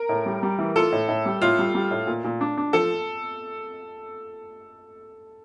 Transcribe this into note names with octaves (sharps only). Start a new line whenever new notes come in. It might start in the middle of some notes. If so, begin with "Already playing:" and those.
Already playing: A#4
A2
G3
G3
E3
F4 A4
A2
A2
G3
A2 F4
G3
G3
A2
A#2
A#2
D4
D4
F3 A4